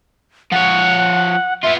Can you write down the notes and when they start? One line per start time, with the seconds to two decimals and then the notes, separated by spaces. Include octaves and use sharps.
0.52 F3 C#5 F#5
1.63 B3 F4 E5